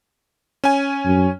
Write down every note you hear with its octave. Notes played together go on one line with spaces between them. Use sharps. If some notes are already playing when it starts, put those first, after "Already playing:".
C#4 G#5
F#2